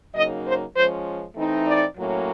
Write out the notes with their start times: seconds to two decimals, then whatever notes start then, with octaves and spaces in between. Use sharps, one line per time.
0.14 C#3 F#3 A#3 D#4 D#5
0.45 C5
0.75 F3 G#3 C#4 C5
1.36 E3 A3 C4 D#4
1.66 D5
1.97 A2 F#3 A#3 C#4